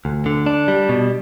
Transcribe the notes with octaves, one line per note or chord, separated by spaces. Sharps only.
D2
D3
D4
G3
B2